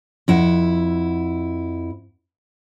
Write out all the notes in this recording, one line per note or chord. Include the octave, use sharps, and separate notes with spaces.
F2 E4 F#5